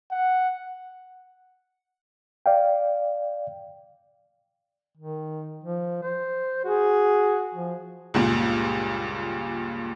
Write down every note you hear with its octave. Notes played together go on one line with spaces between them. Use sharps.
F#5
D5 F5 G5
D#3
F3
C5
F#4 G#4
F3
C#2 G2 A#2